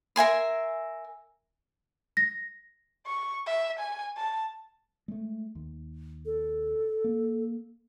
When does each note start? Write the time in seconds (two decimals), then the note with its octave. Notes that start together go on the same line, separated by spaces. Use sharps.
0.16 A#4 E5 G#5 C6
2.17 A#6
3.06 C#6
3.47 E5
3.80 G#5
4.17 A5
5.08 G#3 A3
5.55 D#2
6.26 A4
7.04 A#3